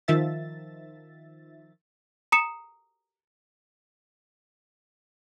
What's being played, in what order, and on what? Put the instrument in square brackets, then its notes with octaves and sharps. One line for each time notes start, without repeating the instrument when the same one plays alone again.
[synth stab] D#3 F3 E5 A6
[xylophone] A#5 D#6 C#7 E7